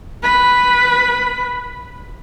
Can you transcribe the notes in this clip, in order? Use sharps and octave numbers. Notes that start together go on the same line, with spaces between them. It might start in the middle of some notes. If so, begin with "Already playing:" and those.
B4 B5